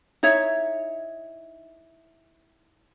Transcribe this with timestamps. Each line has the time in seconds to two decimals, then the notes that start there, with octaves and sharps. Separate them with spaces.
0.23 D#4 E4 C#5 E5